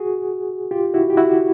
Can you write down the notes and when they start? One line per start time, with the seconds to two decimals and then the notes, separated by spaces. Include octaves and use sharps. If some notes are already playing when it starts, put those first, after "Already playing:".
Already playing: F#4 G#4
0.71 F4 G4
0.94 E4 F#4
1.10 G4
1.17 E4 F#4